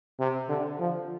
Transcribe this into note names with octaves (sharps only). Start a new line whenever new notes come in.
C3
D3
F3